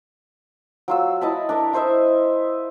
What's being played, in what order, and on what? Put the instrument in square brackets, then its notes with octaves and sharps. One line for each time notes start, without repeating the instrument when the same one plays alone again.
[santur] F#3 F4 E6
E4 D#5 A5 B5
D4 A#4
E4 C5 D#5 E5